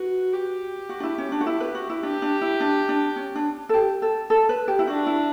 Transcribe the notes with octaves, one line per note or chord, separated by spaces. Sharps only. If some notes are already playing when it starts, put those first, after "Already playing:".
Already playing: F#4 B4
G4
F#4
D4
E4
C#4
D4
F#4
E4
B4
F#4
E4
D4 G4
D4
E4
D4
D4
C#4
D4
A4
G4
A4
A4
B4
G4
E4
D4 F#4
E4